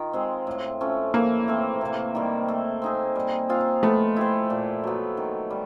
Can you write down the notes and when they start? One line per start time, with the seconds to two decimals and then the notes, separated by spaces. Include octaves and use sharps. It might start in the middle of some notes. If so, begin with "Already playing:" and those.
Already playing: D#3 F4
0.13 G#3 C4
0.47 A2
0.81 F3 A3 C#4
1.14 E3 A#3
1.48 A3 C4
1.81 C3
2.15 D#3 G3
2.48 A3
2.82 C4 D#4 G#4
3.16 G3
3.49 C4 F4 G#4
3.83 A3 B3
4.16 E4 G4 C5
4.50 A#2
4.84 F#3 B3
5.17 D#3
5.50 G3